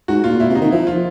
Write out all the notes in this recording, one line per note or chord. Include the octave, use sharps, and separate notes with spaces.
G#2 F#4
A#2 F4
A#2 E4
C3
D#4
D#3
F3 E4
F4